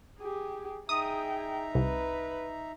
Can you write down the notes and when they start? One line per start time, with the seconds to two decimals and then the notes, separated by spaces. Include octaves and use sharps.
0.19 G4 G#4
0.89 D#4 G#4 E5 G5 A#5 D#6
1.75 C2 B4